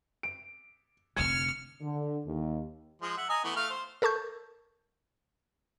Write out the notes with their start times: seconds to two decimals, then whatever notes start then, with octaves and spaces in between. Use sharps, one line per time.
0.23 D7
1.17 F1 D3 F6 G#6 C#7
1.82 D3
2.26 D#2
3.02 F3 G#3
3.17 E5 F#5
3.30 D#5 G#5 A#5
3.44 E3 A3 B3
3.56 A3 F5 F6
3.70 C5
4.02 A4 A#4 A5 C#6 G6